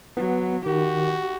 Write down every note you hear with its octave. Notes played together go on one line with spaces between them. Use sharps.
F#3 B3
D#3 F#4 G4